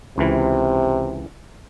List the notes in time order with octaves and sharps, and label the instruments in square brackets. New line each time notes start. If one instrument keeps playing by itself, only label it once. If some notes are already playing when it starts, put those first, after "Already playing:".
[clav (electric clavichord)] C#2 E3 [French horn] C3